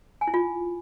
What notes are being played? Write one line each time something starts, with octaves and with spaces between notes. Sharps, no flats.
G#5
E4
F4